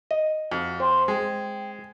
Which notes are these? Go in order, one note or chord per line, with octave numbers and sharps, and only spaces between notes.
D#5
F2 F#4
C4 C6
G#3 G5